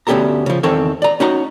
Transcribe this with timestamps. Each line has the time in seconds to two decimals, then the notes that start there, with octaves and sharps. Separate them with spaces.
0.07 D2 B3 C#4 G4 A4 A#5
0.46 C#3 F3
0.63 E2 D#3 C4 A4 C#5
1.02 D5 A#5
1.20 C#4 D#4 F#4 F#5 A#5